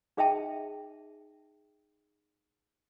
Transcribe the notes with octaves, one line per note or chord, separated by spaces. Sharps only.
D#4 G#4 D#5 E5 G5 A5